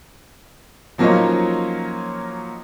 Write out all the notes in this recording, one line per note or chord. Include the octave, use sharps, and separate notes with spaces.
F3 F#3 A#3 C#4 D#4 F4